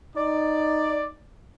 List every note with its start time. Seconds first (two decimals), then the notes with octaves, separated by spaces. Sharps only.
0.16 D#4 D5